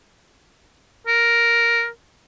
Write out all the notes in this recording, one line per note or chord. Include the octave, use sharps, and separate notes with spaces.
A#4